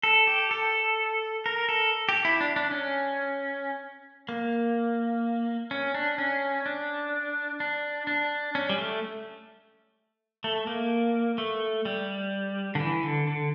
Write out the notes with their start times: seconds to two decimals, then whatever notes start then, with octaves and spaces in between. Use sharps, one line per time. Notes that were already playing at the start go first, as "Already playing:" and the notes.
0.03 A4
0.27 G4
0.51 A4
1.46 A#4
1.69 A4
2.09 G4
2.25 E4
2.41 D4
2.56 D4
2.71 C#4
4.29 A#3
5.71 C#4
5.94 D4
6.18 C#4
6.66 D4
7.60 D4
8.07 D4
8.55 C#4
8.70 G3
8.78 A3
10.44 A3
10.67 A#3
11.38 A3
11.85 G3
12.75 D3
12.80 E3
13.03 D3
13.27 D3